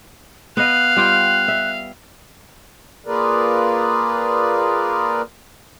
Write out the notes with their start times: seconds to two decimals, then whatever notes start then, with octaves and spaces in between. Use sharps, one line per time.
0.57 B3 D#5 F5 F#6
0.96 G3 F4 G5
1.48 E5
3.06 A#3 F4 G#4 A#4 B4 D5